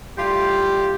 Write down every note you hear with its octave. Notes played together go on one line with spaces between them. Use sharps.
A2 G3 F4 G4